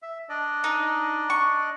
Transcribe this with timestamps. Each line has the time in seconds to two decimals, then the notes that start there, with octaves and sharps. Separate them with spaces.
0.02 E5
0.29 D4 D5 D#5
0.64 D#4
1.30 C#6